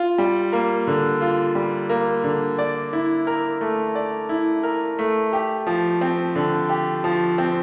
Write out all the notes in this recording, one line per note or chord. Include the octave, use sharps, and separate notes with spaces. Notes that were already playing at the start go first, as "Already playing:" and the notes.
Already playing: F4
G3
A#3
D3
F4
G3
A#3
D3
D5
E4
A#4
A3
D5
E4
A#4
A3
G4
F3
C4
D3
G4
F3
C4